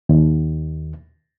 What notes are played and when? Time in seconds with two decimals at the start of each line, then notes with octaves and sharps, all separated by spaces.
0.09 D#2